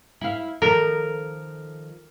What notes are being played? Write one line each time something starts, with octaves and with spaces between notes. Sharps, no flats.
E4 F5
D#3 F3 A4 A#4